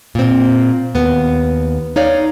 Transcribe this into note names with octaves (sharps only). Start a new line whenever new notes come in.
A#2 C4
D#2 B3
D#4 C#5 D5 F5